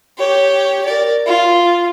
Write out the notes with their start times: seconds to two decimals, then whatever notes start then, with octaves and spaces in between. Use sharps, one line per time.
0.18 G4 C#5
0.85 A#4 D5
1.26 F4